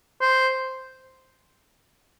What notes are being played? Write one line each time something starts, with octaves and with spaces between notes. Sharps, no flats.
C5